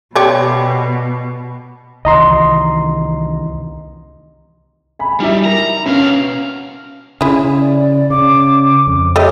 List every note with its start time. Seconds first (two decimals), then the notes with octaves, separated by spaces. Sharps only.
0.15 B2 G4 C#5 D5
2.05 C2 D#3 E3 D#5 A#5 C6
4.99 G#5 B5
5.20 G3 D#4 E4 E5
5.45 A#4 A#5
5.86 B2 B3 C#4 F5
7.21 C#3 E4 G#4
7.60 D5
8.10 C#3 D6
8.87 F2
9.16 A3 G4 C#5 D#5